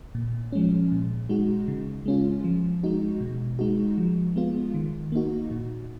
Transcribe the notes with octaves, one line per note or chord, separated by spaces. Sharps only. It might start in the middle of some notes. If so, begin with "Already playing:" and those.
A#2
F3 G#3 C#4
A#2
G#3 D#4 F#4
C#3
G#3 C#4 F4
F3
G#3 D#4 F#4
B2
G#3 D#4 F#4
F3
G#3 B3 F4
D#3
A#3 D#4 F#4
A#2